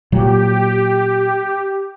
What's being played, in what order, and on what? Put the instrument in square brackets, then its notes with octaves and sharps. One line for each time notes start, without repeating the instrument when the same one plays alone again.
[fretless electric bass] A#2 F#3 [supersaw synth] G4